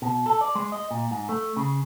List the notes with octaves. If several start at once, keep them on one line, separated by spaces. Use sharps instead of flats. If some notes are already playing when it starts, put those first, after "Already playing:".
B2
A4
D5
G#3
D#5
A#2
G#2
A3
C#3